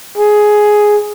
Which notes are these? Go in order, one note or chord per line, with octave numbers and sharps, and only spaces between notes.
G#4